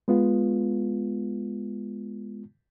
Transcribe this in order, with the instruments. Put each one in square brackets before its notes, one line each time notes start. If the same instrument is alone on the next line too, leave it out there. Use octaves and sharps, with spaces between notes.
[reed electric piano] G#3 B3 F4